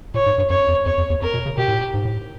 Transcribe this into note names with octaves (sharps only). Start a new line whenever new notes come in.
A#2 C#5
G#2
G2
F#2 C#5
F2
F2 C#5
F2
E2
F2 A#4
B2
C#3
B2 G4
A2
A#2
G#2
A2